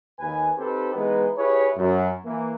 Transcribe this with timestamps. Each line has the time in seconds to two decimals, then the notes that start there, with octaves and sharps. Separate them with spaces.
0.19 D#2 B4 G#5
0.58 C4 D#4 G4 A4 B4 C5
0.94 E3 G#3 B3 D#4 B4
1.37 E4 G4 G#4 B4 C#5
1.76 F#2
2.25 E3 A#3